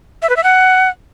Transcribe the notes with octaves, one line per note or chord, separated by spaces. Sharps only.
E5
B4
E5
F#5